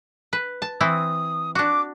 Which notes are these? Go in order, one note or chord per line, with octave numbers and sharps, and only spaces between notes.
B4
A5
E3 C4 E4 D#6
D4 F#4 D6